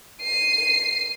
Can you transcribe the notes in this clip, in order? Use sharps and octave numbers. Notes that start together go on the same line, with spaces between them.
C7 D#7